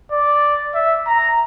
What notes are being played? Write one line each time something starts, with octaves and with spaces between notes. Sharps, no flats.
D5
E5
A#5